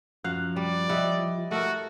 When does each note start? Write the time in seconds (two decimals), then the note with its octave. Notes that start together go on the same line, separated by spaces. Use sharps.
0.24 F#2 F3 F#4 F5 F#6
0.56 G3 D5
0.89 G3 E4 G4 D#5 F#5
1.51 A3 F#4 A4 A#4